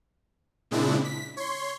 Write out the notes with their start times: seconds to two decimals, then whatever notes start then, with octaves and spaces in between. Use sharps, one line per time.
0.71 A#2 C#3 G#3 C4 D4 E4
1.04 B6
1.37 C#5 C6